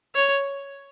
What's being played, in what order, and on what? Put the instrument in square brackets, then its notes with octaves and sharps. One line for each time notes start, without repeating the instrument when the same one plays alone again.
[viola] C#5